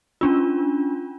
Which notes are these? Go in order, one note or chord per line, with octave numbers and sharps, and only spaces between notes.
C#4 D4 F4